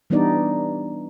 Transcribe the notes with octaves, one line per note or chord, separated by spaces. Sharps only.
E3 G3 B3 D4 D#4 D5